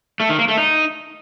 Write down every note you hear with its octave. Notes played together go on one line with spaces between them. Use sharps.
A3
D#3
A#3
A3
D#4